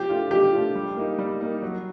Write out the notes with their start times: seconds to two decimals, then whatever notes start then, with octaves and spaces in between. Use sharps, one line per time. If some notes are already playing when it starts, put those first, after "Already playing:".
Already playing: F3 G4
0.09 A3 D4 F4
0.31 F3 G4
0.53 A3 D4 F4
0.75 G3
0.96 A#3 D#4
1.19 G3
1.41 A#3 D#4
1.63 F#3